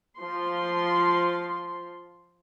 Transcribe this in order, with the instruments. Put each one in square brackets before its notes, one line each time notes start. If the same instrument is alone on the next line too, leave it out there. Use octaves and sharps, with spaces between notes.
[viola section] F3 C6